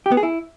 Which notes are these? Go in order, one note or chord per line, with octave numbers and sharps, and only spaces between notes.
G4
B3
G#4
E4